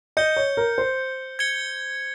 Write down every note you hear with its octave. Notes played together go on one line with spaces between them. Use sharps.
D#5 G6 C#7 G7
C#5
A#4
C5
G#6 C#7 G7